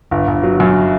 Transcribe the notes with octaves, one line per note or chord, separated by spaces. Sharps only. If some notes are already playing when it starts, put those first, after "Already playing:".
G1
G1
F#3
F#2